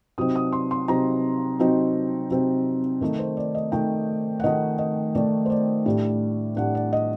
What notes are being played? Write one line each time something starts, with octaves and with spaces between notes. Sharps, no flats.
C3 F#3 C4 D#4 D#6
D#6
C6
C6
C3 F#3 C4 D#4 A#5
C3 F#3 C4 D#4
C3 F#3 C4 D#4
D#3 A3 D#4
C5
D5
D#5
D#3 A3 D#4 G5
F#5
D#3 A3 D#4 D#5
D#5
D#3 A3 D#4 D5
C5
D5
A2 G3 D4 D5
A2 G3 D4 F#5
D5
D#5